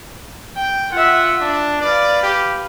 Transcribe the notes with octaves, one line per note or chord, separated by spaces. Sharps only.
G5
F4 E5 F#5
D4
B4 D5 F5
G4